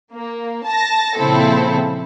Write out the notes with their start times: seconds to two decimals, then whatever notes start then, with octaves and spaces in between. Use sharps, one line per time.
0.14 A#3
0.66 A5 A#6
1.17 A#2 C#3 F3 C4 E4 A4